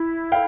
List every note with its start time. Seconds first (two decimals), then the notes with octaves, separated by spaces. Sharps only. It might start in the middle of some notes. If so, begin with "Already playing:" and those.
Already playing: E4
0.32 A4 F5 G5